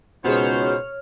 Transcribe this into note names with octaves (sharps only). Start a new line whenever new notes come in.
C#2 B2 B3 D#4 G#4 C5 C#5 F6